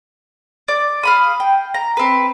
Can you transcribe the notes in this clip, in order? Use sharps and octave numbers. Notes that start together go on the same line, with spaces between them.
D5
F5 B5 D#6
G5
A#5
C4 B4